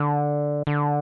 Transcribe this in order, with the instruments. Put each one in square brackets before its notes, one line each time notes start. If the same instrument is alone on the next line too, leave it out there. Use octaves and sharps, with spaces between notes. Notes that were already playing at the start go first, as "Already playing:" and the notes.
Already playing: [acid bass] D3
D3